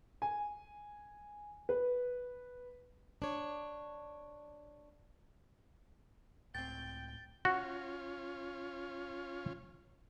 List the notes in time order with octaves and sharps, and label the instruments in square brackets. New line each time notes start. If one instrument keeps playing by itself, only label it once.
[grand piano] G#5
B4
[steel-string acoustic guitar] D4 C#5
[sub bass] C#2 [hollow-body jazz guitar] A2 C4 [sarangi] G5 [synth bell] A6
[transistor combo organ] C#4 F4 [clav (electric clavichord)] F#4